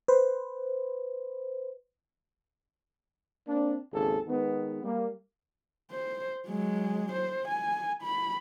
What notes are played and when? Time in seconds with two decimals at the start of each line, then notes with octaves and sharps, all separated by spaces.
0.08 B4 C5
3.48 A#3 C4 D4
3.93 G#1 D#2 C#3 G#4 A4
4.28 D#3 G#3 B3
4.84 G3 A#3
5.91 C5
6.47 F#3 G#3
7.12 C5
7.49 G#5
8.03 B5